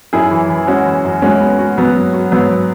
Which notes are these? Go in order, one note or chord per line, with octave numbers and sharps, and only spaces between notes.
F#2 E4 G#4
E3
E3
G#3 C#4 F#4
E3
F#2
G#3 C#4 F#4
B3
F#4
F#3 B3 F#4
B3
F#4
G#2 F#3 B3